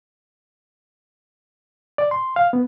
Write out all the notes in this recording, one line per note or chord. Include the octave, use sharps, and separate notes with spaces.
D5
C6
F5
B3